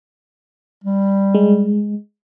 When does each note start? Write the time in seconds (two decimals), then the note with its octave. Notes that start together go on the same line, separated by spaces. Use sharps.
0.84 G3
1.35 G#3